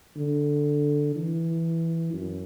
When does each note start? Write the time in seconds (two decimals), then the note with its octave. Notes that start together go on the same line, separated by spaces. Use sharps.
0.17 D3
1.16 E3
2.13 F#2